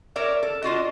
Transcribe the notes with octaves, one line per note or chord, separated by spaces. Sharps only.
A#4 C#5 D5 E5
A4
D4 F4 F#4 D#5